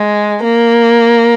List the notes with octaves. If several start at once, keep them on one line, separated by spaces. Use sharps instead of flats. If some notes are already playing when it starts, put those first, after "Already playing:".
Already playing: G#3
A#3